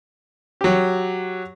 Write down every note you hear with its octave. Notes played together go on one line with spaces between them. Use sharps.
F#3 G4